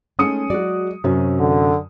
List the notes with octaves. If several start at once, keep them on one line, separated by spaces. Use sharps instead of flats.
G#3 A3 C#4 D#4 D#6 C#7
F#3 G#3 F#4 D5
F#2 C3 C#4 F#4
D3